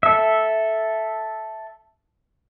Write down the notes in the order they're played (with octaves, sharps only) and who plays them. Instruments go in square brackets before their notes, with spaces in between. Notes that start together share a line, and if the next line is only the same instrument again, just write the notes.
[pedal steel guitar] A4 E5